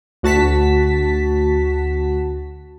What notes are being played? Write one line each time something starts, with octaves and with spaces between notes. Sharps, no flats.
D2 F#4 A5 B6